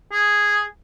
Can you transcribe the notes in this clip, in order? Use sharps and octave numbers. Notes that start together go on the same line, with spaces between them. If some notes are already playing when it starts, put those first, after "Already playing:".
G#4